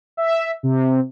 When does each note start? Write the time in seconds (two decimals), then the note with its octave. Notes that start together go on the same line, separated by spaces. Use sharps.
0.17 E5
0.63 C3